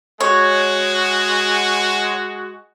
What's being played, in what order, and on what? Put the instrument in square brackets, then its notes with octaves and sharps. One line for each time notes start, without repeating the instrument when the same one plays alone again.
[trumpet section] G#3 F#4 [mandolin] C#5